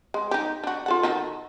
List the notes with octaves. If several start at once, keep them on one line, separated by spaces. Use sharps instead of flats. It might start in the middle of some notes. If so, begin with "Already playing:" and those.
G#3
D#4 G4
D4 F#4
F4 A4 F#5
D#3 F#4 A4